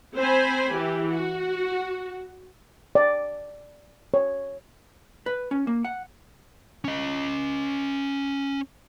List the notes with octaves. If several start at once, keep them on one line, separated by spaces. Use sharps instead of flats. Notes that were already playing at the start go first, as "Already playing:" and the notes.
C4 C5 G#5 B5
E3 G4
F#4
D5
C#5
B4
C#4
A#3
F#5
C#4 D#5